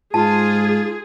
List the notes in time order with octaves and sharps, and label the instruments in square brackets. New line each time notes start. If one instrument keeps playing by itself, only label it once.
[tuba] G#2 [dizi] F4 [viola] G#4 [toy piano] A5